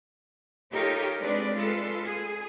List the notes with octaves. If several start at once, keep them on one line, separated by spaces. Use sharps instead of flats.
D#4 F4 G4 A4 A#4 C#5
G#3 C4 D4 B4 D5
G#3 F4 A4 B4
G#4